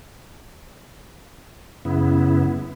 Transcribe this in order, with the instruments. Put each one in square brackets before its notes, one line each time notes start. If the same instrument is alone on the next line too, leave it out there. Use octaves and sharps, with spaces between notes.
[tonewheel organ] F#2 C#3 B3 E4